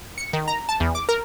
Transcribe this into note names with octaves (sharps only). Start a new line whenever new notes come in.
C#7
D#3
A#5
A5
E2
D6
A#4